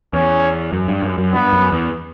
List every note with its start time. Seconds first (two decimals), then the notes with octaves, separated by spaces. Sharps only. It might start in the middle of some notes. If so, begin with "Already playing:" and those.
0.13 E2 C#4
0.72 F#2
0.88 G2
1.02 F#2
1.18 F#2
1.33 G2 B3
1.53 F#2
1.72 E2